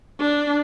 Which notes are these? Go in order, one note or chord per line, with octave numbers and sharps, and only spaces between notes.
D4